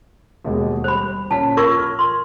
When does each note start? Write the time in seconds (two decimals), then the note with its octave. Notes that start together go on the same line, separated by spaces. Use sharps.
0.45 D#2 B2 G#3
0.84 G3 C5 B5
1.31 A#2 C#4 A5 B6
1.57 F4 A#4 C#6 G#6
1.77 F6
1.99 C6